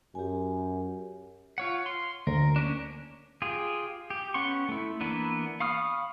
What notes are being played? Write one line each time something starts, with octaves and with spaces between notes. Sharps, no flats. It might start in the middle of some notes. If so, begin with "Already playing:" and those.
F#2 G4 G#5
F4 C#5 F#5
C6
D2 A#4
A#3 C#4 D4
F4 G4 G#4
G4
B3 C#4 F#5 C6 C#6
A3 E4
E3 A#3 B3 D4 B4
F5 B5 C#6 D#6 F6